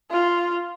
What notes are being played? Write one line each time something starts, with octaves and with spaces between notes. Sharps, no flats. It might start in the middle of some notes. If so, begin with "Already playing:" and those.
F4